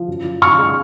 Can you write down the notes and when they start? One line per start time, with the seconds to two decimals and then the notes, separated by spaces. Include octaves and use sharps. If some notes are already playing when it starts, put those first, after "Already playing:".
Already playing: F3
0.08 F#2
0.24 F3
0.41 F#2 C#6 F6
0.58 G#3